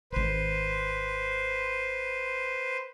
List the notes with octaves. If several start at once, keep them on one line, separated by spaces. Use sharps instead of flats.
D#1 G#1 B4 C5